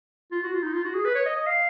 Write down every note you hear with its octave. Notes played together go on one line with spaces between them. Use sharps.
F4
F#4
F4
D#4
F4
F#4
G#4
B4
C#5
D#5
D#5
F5